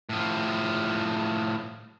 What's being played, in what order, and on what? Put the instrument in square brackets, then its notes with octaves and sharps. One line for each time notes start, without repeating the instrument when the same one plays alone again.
[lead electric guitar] A2 F3